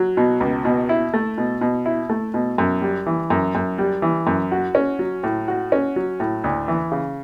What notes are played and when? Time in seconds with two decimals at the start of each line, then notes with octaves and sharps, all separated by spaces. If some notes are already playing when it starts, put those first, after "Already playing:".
Already playing: F#3
0.17 B2
0.40 C#2
0.65 B2
0.89 E4
1.14 A3
1.38 B2
1.61 B2
1.86 E4
2.09 A3
2.34 B2
2.58 F#2
2.81 G3
3.06 E3
3.30 F#2
3.55 F#2
3.78 G3
4.02 E3
4.27 F#2
4.52 F#4
4.75 C#4
4.99 F#3
5.23 A2
5.48 F#4
5.72 C#4
5.96 F#3
6.20 A2
6.44 D2
6.68 E3
6.92 C#3